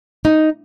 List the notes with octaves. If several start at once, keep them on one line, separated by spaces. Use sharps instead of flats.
D#4